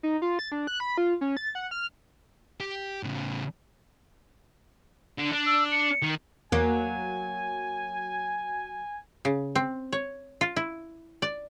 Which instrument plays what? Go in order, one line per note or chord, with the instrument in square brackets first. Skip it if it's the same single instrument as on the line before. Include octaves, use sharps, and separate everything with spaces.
[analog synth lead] D#4
F4
A6
D4
F#6
B5
F4
C#4
A6
F#5
F6
[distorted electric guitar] G4
A2 C#3
D3
D4
[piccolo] E6
C#7
[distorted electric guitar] D#3
[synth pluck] E2 [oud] F#3 A#3 [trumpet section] G#5
[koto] C#3
C4
C#5
F4
E4
D5